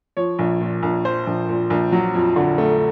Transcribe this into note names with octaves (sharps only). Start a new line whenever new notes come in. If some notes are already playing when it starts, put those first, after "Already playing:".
F3 C#5
A#1
A#2
A#1
F3 C5
A#1
A#2
A#1
F#3
F2
D3
A3